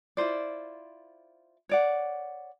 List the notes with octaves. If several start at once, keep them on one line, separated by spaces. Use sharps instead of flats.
E4 F4 C5 D5
C#5 D5 F#5